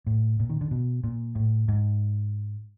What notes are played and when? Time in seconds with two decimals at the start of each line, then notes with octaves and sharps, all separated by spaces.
0.07 A2
0.40 A#2
0.50 D#3
0.61 D3
0.71 B2
1.04 A#2
1.35 A2
1.68 G#2